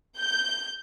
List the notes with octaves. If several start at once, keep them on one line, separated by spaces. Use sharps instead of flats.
G6